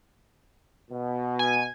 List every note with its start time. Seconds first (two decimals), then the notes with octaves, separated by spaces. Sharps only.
0.90 B2
1.39 G#5